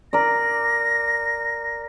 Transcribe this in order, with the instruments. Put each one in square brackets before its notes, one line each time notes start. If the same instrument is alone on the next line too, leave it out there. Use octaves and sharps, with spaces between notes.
[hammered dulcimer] A#4 D5 [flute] A#6